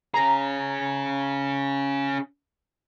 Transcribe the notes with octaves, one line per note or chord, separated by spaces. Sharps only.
C#4 G#4 A#5